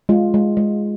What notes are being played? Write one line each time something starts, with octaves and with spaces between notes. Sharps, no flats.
G#3 F4
G#3
G#3